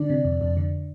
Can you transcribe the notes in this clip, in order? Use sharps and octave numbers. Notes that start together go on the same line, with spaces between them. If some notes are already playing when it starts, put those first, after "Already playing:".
Already playing: D3 D4 D5
C3
F2
F2
D3